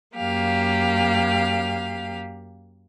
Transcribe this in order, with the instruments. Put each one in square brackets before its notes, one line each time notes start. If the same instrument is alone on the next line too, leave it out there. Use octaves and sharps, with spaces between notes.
[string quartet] F#2 A#3 G4 F5